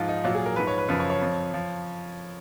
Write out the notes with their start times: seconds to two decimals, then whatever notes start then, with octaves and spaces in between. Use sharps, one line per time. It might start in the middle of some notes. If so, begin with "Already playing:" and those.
Already playing: G#2 F3 F4
0.09 D#4
0.24 A#2 F#3 F4
0.35 G#4
0.46 A#4
0.56 G#2 F3 B4
0.67 C#5
0.78 B4
0.88 F#2 C#3 F3 B4
1.00 C#5
1.10 C#5
1.21 F2 F3
1.54 F3